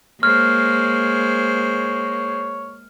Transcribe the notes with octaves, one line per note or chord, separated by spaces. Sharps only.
G#3 A#3 C5 C#5 F6